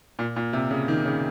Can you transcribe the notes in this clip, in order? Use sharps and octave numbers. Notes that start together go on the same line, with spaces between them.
A#2
A#2
C3
C#3
D#3
C#3